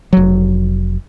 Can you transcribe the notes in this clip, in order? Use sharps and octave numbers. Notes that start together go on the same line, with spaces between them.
F1 F#3